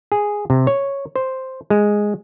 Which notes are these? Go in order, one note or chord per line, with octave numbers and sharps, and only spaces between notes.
G#4
C3
C#5
C5
G#3